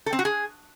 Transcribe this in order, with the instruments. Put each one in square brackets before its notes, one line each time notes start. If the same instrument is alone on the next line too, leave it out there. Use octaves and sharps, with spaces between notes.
[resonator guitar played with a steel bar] A4
C4
F#4
G#4